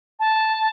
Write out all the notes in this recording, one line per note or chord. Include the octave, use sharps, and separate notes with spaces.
A5